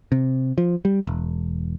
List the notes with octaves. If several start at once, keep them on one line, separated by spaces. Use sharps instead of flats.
C3
F3
G3
E1